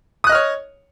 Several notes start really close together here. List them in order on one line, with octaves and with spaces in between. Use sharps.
D#6 F#6 D#5 F6 C#5